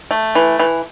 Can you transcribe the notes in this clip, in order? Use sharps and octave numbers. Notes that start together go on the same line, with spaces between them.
A3
E3
E3